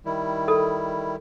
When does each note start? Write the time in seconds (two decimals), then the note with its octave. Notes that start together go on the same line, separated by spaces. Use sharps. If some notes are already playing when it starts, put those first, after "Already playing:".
0.05 D#3 G3 E4
0.48 A4